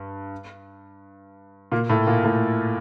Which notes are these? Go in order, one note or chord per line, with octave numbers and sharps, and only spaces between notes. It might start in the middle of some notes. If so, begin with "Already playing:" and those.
Already playing: G2
A#2 A#3
A2 A3
A#2 A#3
A2 A3